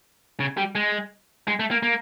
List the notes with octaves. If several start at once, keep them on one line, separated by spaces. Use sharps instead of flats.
C#3
G3
G#3
G#3
A3
A#3
A#3